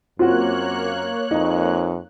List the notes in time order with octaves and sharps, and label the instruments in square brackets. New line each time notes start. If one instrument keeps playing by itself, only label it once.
[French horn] F#2 [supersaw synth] A#3 C#5 F#6 [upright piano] C4 F#4 [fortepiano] F4
[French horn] F2 [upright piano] D#4